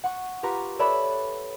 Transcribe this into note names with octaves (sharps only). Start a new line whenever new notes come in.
F#5 C#6
F4 G4 B4 A#5 C#6
A4 B4 C#5 D5 E5 B5